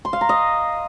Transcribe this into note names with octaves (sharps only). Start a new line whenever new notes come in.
C6
F5
A#5
D#5